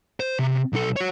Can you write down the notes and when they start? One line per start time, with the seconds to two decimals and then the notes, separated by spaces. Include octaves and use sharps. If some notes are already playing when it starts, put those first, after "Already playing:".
0.20 C5
0.39 C3
0.73 B1 A4
0.96 F#4 C#5